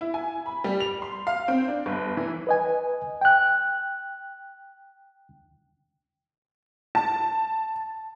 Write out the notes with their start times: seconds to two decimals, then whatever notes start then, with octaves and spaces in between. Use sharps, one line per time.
0.01 E4
0.14 G#5
0.46 B5
0.64 G3
0.80 F7
1.02 C6
1.27 F5
1.48 C4
1.68 D4
1.86 G1
2.17 E3
2.47 B4 D#5 G#5
3.21 G5 F#6
6.95 A5